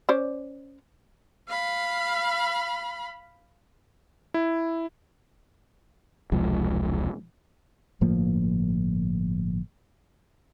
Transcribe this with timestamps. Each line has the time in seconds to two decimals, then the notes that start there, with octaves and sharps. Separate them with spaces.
0.09 C#4 C5 D5
1.49 F5 B5
4.34 E4
6.32 E1 C2 F3 G#3
8.01 G1 A2 F3 A#3